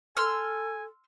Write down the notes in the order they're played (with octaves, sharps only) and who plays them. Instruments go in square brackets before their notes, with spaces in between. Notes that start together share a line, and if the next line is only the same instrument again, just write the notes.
[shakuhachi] A4 [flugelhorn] G#5 [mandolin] C6 E6 F6